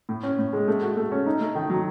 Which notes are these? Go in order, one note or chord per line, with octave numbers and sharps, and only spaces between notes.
A2
C#4
A2
G#3
A3
F#4
A3
C#4
D#4
A3
D#3
F#3